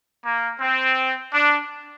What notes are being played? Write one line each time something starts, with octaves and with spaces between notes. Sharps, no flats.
A#3
C4
D4